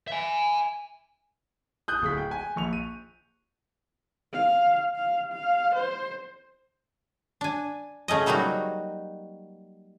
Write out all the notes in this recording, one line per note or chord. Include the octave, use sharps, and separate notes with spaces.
E5 G#5
D#6 F#6 G6
D1 G#4 B6
G5
G#5
A#1 C#6 F7
D#7
F5
F5
F5
C5
D4 G#5
C#3 A3 C#4 D#5
F#3 G3 A#3 D#4 F#4